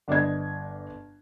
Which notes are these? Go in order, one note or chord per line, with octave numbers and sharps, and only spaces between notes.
G1 D5 D#5 G#6